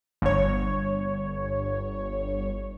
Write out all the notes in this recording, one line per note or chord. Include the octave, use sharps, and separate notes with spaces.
G1 C#5